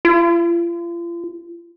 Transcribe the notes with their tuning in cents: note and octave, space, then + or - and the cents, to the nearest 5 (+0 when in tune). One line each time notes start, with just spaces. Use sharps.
F4 -40